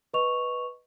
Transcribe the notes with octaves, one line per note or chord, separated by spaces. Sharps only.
B4 D#5 C#6 F7